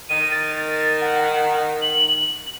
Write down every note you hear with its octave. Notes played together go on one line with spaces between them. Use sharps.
D#3 D#7
A6
F#5
F#7